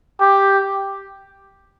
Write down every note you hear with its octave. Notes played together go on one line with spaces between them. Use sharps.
G4